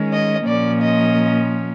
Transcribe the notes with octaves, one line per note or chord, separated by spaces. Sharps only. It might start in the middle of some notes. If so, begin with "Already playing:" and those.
Already playing: D#3 G#3 C#4
D#5
A#2 F3 A#3 C#4 D5
D#5